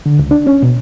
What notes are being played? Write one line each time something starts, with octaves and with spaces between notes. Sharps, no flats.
D3
C#2
D4
C#4
B2